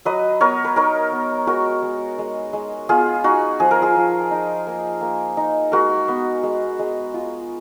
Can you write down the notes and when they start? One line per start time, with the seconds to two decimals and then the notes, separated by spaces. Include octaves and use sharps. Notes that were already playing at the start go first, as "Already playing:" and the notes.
0.05 F#3 B4 D#5
0.41 B3 A#4 C#5
0.65 B4
0.76 D#4 A#4 C#5
1.12 B3
1.47 G#3 F#4 A#4
1.83 G#3
2.19 G#3
2.53 G#3
2.89 B3 F4 G#4
3.24 D#4 F#4
3.60 F3 G#4
3.71 A#4
3.82 F4 G#4
3.96 F3
4.31 D#4
4.67 A#3
5.01 A#3
5.37 D#4
5.72 G#3 F#4 A#4
6.08 B3
6.43 G#3
6.79 G#3
7.14 F4